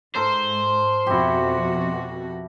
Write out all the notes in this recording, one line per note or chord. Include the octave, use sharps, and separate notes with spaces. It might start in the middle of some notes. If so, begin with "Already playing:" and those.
G#2 A4 A#4 C5
F2 B2 E4 F#4 G4